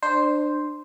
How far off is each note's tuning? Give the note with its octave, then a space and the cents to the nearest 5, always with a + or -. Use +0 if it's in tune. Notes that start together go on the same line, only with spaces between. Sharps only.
D4 +25 C5 +0